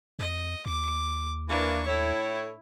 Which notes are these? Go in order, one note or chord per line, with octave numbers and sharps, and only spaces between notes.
F2 D#5
D#2 D6
E3 A#3 D4 C#6
A2 E4 C#5